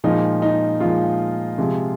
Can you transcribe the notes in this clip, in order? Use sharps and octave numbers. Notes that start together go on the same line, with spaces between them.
A#2 F3 G#3 D#4
D#4
A#2 F3 G#3 F4
C3 F3 G#3